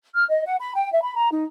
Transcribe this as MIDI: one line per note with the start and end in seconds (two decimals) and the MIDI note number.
0.14 0.24 89
0.29 0.43 75
0.46 0.55 78
0.58 0.73 83
0.74 0.91 79
0.91 1.02 76
1.03 1.15 83
1.16 1.29 82
1.31 1.43 63